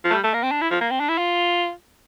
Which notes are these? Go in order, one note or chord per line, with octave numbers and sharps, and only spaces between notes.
F3
A3
G3
A3
A#3
C4
D4
E4
F3
A#3
C4
D4
E4
F4